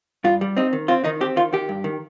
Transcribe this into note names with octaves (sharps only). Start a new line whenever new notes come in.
G2 F4
G3
C4 D#4
D#3
C4 F4
D#3 D#4
C4 G4
D#3 F4
D#3 G4
G2
D#3